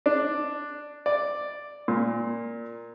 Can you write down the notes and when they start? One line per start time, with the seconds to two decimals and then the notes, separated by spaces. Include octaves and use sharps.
0.06 D4
1.06 D5
1.88 A#2